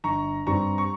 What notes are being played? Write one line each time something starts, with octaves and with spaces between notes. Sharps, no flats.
G1 A#5 C#6
G2 G3 C4 A#5 C#6
C#6